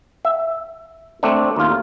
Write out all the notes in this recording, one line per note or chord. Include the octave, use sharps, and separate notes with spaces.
E5
A3 C4 D4
D#2 F4